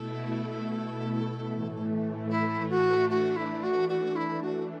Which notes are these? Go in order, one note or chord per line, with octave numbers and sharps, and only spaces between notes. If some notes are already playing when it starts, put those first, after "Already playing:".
Already playing: B2 A3 E4 A4
A2 E3 A3
E4
F#4
E3 A3 D4 F#4
E4
F#4
F#4
E4
F#4